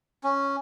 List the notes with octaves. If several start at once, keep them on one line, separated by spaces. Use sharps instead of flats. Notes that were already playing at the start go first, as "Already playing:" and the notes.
C#4